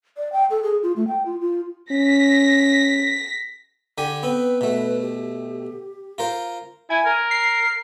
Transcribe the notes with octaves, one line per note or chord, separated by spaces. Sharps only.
D5
G5
A4
G#4
F4
A3
G5
F4
F4
C#4 A#6 B6
D3 G4 G#5
B3 C4 B4
B2 A3
G4
F4 A#4 C5
E4 G#5
A#4
C7